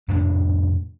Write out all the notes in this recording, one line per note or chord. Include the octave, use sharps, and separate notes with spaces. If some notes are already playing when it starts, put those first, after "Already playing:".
F2 A2 C3 D4